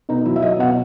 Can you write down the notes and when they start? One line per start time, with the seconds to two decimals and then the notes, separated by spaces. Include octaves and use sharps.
0.09 B2 D#4
0.25 F#3 E4
0.36 E5
0.42 F#3 D#5
0.59 B2 F#5